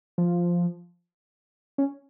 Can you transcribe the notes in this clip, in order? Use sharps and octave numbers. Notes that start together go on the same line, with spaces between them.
F3
C#4